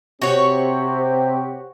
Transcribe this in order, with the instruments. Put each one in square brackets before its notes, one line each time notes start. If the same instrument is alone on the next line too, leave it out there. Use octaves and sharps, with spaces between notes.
[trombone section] C3 C4 [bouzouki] F#4 C#5 [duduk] G4